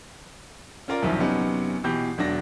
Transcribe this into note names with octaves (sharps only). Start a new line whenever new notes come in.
C#4 F4 A#4 D5
C2 F#2 D#3 F3
F#2 C3 B3 C#4 D#4
B2 E3 G4 G6
E1 F#3 D4 A#6